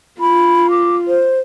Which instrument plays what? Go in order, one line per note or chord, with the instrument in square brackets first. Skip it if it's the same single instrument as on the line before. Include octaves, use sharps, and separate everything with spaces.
[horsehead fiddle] F4 [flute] B5
[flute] D6
C5